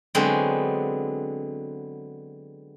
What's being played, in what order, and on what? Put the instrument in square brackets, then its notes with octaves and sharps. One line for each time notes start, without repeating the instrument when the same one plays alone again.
[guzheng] D3 F#3 G#3 B3 C4